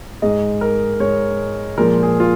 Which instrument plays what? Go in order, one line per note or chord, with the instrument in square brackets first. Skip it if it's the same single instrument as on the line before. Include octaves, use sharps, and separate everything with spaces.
[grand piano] G#2 G#3 D#5
A#4
G#2 G#3 C#5
A#2 F3 G#3 A#4
G#4
F4